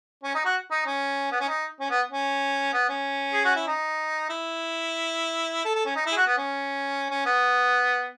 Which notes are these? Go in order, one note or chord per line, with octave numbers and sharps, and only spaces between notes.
C#4
D#4
F#4
D#4
C#4
B3
C#4
D#4
C#4
B3
C#4
B3
C#4
G#4
F#4
E4
D#4
E4
A4
A4
C#4
D#4
E4
G#4
F#4
B3
C#4
C#4
B3